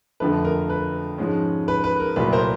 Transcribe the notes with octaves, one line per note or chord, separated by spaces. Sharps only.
F2 D3 F3 A3 B4
A#4
B4
G#2 F3 G#3 C#4
B4
B4
A#4
C2 A#2 F#3 A3 B4
A#4 C5